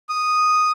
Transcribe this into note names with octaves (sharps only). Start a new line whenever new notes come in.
D#6